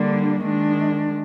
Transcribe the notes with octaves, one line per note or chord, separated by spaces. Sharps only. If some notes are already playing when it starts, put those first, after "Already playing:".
Already playing: D3 G3 A#3 D4
D#3 G#3 D4